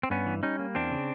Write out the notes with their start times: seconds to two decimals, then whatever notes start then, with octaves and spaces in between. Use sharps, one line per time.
0.03 C4
0.10 G2 B3 C#4
0.26 E3
0.43 G3 C#4 D#4
0.59 A#3
0.75 E2 C4 D4
0.91 C#3